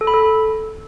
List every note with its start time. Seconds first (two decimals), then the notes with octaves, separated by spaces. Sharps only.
0.01 A4
0.07 B5
0.14 A4